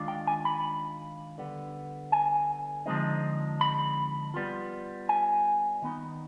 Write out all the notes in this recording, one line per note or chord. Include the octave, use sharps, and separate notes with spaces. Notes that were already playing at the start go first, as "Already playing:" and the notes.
Already playing: D#3 G#3 D4 F4
G5
G#5
B5
D3 G3 B3
G#5
D3 F3 G#3 C4 D#4
B5
G3 B3 F4
G#5
D#3 B3 D#4